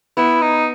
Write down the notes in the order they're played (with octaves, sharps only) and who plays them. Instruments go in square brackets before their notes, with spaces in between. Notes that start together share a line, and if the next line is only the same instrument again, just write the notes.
[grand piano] B3 [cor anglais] E4
[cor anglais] D#4